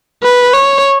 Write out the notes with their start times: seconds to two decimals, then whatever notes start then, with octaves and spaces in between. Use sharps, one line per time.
0.23 B4
0.54 C#5